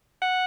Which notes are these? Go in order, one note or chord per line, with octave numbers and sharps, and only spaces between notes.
F#5